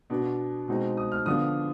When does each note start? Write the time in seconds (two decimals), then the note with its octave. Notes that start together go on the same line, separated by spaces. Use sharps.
0.10 B2 B3 D4
0.68 B2 G#3 C4 D#4
0.97 D#6
1.12 F6
1.26 D3 F3 B3 D4 D#6